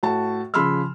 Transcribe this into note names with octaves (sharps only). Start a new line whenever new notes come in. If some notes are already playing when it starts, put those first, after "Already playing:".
A2 F#4 A5
C#3 F3 B5 C6 E6 F6